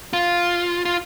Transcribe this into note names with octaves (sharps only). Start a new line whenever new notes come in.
F4
F4